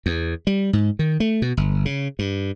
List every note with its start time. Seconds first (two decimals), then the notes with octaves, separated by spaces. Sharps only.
0.06 E2
0.47 G3
0.73 G#2
0.99 D#3
1.20 A3
1.42 B2
1.57 G1
1.85 C#3
2.19 G2